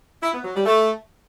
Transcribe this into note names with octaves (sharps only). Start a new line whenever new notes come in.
E4
B3
F#3
G3
A3